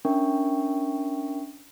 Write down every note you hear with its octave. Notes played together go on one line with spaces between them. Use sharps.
C#4 D4 A#4 E5 G5 C#6